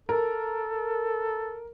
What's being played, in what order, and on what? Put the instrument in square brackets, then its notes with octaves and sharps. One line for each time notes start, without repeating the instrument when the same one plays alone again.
[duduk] A4 [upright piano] A#4